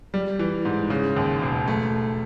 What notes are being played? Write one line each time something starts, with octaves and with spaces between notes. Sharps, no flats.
G3
E3
G#2
C#3
D#2
E1
A3